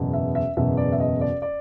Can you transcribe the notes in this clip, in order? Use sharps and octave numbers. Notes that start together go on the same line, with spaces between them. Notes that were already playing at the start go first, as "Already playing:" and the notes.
Already playing: F#1 E2 B2
E5
E5
F#1 E2 B2 E5
D5
E5
D#5
D5
D5